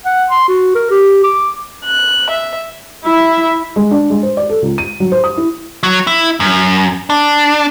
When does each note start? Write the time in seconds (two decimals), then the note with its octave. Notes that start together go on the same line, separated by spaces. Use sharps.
0.05 F#5
0.30 C6
0.48 F#4
0.75 A#4
0.91 G4
1.24 D6
1.85 F#6
2.29 E5
3.04 E4 E5
3.76 G#3
3.91 D4
4.10 G#3
4.23 C5
4.37 D5
4.49 A4
4.62 C#2
4.78 D#7
5.00 F#3
5.12 C5
5.24 D#6
5.37 E4
5.83 F#3
6.07 E4
6.40 F#2
7.10 D4